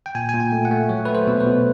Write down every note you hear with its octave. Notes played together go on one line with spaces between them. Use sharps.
G5
A#2 G#5
A#2 G#5
G5
A3
F#5
A3
F#3 C#5
A3 B4
C5
B2
B4
B2